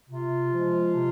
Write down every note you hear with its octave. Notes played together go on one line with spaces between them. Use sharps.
C3 F4
F3 G#3
C3